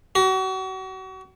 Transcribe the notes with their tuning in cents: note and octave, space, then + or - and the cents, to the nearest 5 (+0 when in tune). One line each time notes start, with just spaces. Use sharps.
F#4 +35